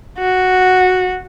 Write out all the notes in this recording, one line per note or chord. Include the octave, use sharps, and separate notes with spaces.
F#4